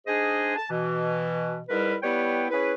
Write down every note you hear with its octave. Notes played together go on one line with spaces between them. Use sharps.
G#2 D4 G#4 C5 D#5 G#5
A5
B2 E3
G#2 G3 E4 A#4 B4
G3 B3 E4 B4 C#5 G5
C#4 E4 G#4 B4